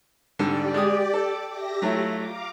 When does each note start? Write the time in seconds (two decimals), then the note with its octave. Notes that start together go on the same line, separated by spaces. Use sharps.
0.39 G#2 D3 G3 G4 D5
0.74 G#3 D#6
1.14 A4 D6
1.49 G4 E5 A#6
1.82 F#3 A3 E4 F4
2.16 F5 A#5 D6